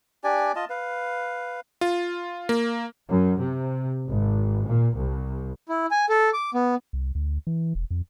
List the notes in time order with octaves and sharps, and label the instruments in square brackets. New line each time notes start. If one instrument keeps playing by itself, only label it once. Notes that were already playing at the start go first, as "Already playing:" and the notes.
[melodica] D4 G4 D5 G#5
F4 D#5 A5
B4 F5
[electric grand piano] F4
A#3
[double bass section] F#2
C3
G#1
A#2
C2
[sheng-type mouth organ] E4
G#5
A4
D6
B3
[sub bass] C2
D2
E3
E1
F2